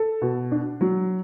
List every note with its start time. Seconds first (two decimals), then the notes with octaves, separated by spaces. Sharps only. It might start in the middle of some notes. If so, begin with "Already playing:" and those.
Already playing: A4
0.22 B2
0.51 D4
0.81 F#3